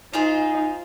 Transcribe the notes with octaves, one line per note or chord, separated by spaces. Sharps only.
D#4 F4 G#4 C5